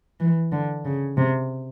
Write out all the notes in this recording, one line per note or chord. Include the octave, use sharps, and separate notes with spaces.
E3
D3
C#3
C3